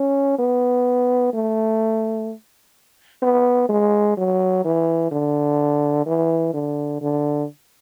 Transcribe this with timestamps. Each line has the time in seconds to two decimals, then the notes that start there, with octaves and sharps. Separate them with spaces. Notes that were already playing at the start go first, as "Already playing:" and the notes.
Already playing: C#4
0.39 B3
1.33 A3
3.22 B3
3.69 G#3
4.17 F#3
4.65 E3
5.11 D3
6.06 E3
6.54 D3
7.01 D3